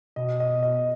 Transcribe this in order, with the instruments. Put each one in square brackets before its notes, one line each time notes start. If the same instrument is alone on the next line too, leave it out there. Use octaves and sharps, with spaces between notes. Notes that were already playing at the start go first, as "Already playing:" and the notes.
[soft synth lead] B2 [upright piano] D#5
[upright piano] D#5
D#5